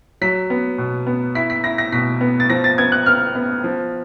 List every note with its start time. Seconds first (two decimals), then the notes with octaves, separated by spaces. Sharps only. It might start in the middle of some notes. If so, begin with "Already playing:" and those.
0.21 F#3 B6
0.50 B3
0.78 B2
1.07 B3
1.35 E4 B6
1.50 B6
1.64 E4 A#6
1.78 A#6
1.92 B2 B6
2.21 B3
2.40 A6
2.50 F3 A#6
2.64 A6
2.78 B3 G#6
2.92 F#6
3.06 B3 F6
3.35 B3
3.64 F3